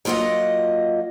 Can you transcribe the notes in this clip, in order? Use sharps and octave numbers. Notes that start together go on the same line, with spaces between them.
F#3 A#3 F4 D#5 F#5